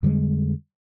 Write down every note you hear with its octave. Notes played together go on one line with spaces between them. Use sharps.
F2 D3 G3 G#3